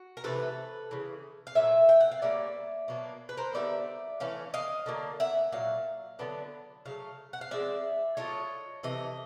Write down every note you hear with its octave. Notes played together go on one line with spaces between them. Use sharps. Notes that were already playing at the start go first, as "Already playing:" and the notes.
Already playing: F#4
A#4
C3 E3 A3 C#4 A4 B4
C#3 E3
F5
A#2 F#3 A3 E5
G5
F#5
F5
D3 G3 A#3 C#4 D5 E5
B2 F#3 A#3 D4
B4
A#4 C5
D3 G3 B3 D#4 D5 E5
E3 A3 C#4 F5
D#5 F5
D3 F#3 A#3
E5 F#5
A#2 F#3 F5
D3 F#3 B3 D4
C#3 F#3 A3 F5
F#5
F5
F3 G#3 C4 D5 E5
F#3 A3 D4 F4 C#5 D#5
C3 E3 A3 D#5